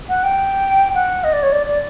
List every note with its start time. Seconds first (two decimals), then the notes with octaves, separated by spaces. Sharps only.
0.09 F#5
0.24 G5
0.95 F#5
1.24 D#5
1.33 D5
1.43 C#5
1.52 D5
1.67 D5